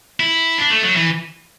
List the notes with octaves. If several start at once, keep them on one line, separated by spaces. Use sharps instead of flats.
E4
D4
A3
F#3
E3